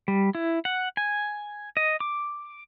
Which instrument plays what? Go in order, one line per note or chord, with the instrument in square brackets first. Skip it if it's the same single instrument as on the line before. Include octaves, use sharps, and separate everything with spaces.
[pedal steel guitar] G3
E4
F#5
G#5
D#5
D6